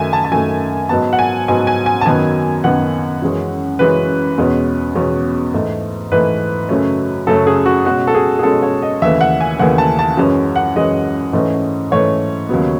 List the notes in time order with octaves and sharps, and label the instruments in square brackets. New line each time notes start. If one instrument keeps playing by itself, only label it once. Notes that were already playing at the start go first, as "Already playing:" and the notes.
Already playing: [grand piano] F#2 D#3 A3 E5 G#5
A5
A5
F#2 D#3 A3 G#5
G#2 F#3 B3 A5
F#5
G#5
G#2 F#3 B3 G#5
G#5
G#5
A5
F#2 D#3 F#3 B3 G#5
F#2 D#3 F#3 B3 F#5
F#2 E3 G#3 C#4
F#2 E3 G#3 C#4 B4
E2 B2 G#3 C#4
E2 B2 G#3 C#4
G#2 E3 A3
G#2 E3 A3 B4
F#2 C#3 F#3 A3 C#4
F#2 C#3 F#3 A3 C#4 A4
G#4
F#4
B2 G#3 C#4 F#4
A4
G#4
G#4
B2 G#3 C#4 A4
C#5
D#5
D#2 C#3 E3 A3 E5
F#5
G#5
D#2 C#3 E3 A3 F#5
A5
A5
F#2 E3 G#3 C#4
F#5
F#2 E3 G#3 C#4 D#5
G#2 E3 A3 C#4
G#2 E3 A3 C#4 C#5
D#2 C#3 F#3 B3